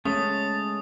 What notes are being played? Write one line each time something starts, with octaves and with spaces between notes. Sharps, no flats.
G#3 A3 C#4 A5 D#6